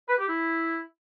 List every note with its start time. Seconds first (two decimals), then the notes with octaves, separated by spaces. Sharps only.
0.08 B4
0.18 G4
0.29 E4